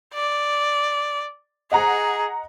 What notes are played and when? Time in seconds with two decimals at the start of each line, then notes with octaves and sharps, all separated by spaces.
0.14 D5
1.72 G#4 D#5 F#5 A#5